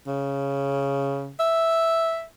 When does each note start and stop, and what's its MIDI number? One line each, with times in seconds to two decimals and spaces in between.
0.07 1.32 49
1.40 2.25 76